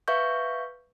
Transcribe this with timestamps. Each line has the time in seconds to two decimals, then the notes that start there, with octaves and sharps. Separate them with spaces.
0.08 B4 E5 F5 C#6 G6